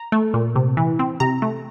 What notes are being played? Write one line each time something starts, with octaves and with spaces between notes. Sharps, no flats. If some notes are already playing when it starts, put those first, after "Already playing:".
Already playing: A#5
A3
A#2
C3
E3
C4
C3 A#5
A3